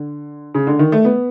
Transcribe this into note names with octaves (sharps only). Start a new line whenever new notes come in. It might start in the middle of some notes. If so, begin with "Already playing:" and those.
Already playing: D3
C#3
D3
D#3
A3
B3